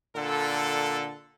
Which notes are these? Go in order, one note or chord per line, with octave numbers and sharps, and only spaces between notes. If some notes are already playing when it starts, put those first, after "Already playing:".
A#2 D3 A4